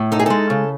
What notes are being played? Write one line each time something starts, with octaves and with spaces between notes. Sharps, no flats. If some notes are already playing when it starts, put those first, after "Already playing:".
Already playing: A2
D#4 A4
G#4
G#3 A4
C#3